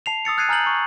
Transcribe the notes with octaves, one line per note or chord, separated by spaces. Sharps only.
A5 C7 F7
D#6 E6 A6 C#7
F6 F#6 G#6 A6 C7 D#7
G#5 A#5 F6 G6 A6 F#7
C#6